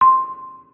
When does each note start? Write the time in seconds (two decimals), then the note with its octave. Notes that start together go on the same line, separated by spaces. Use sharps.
0.01 C6